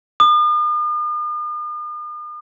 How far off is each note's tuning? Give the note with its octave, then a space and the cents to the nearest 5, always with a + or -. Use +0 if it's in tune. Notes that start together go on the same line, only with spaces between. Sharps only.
D#6 -45